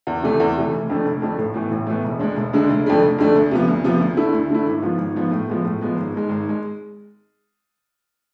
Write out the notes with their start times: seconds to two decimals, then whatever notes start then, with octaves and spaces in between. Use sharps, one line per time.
0.07 E2
0.23 C3 E3 A3
0.40 E2
0.57 C3 E3 A3
0.72 F1
0.90 F2 D3 A3 D4
1.05 F1
1.22 F2 D3 A3 D4
1.38 A1
1.54 A2 E3 B3
1.71 A1
1.87 A2 E3 B3
2.04 E1
2.20 D2 D3 G#3 D4
2.36 E1
2.53 D2 D3 G#3 D4
2.69 F1
2.86 F2 D3 A3 D4
3.02 F1
3.18 F2 D3 A3 D4
3.35 D2
3.51 C3 F3 B3
3.68 D2
3.84 C3 F3 B3
4.00 D2
4.17 D3 A3 E4
4.33 D2
4.50 D3 A3 E4
4.66 G#1
4.82 G#2 F3 B3 F4
4.98 G#1
5.15 G#2 F3 B3 F4
5.31 A2
5.48 F3 G#3 B3
5.64 A2
5.81 F3 G#3 B3
5.96 G#1
6.14 G#2 G#3
6.29 G#1
6.49 G#3